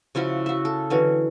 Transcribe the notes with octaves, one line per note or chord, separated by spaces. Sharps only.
C#3 F3 E4 F#4
F#4 E5
A4
D3 E3 F#3 C#4